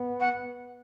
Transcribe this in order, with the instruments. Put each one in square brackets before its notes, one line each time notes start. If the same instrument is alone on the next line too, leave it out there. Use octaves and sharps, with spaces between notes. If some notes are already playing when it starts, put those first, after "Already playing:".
Already playing: [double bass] B3
[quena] F#5